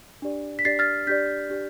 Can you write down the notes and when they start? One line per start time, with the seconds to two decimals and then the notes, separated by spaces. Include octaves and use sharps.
0.22 D4 G4 D5
0.59 B6
0.65 D4 G4 D5 A6 C7
0.79 F6 A6
1.07 D4 G4 D5 G6 B6
1.50 D4 G4 D5